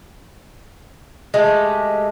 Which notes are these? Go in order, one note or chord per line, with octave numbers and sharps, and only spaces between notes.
G#3 A3 G4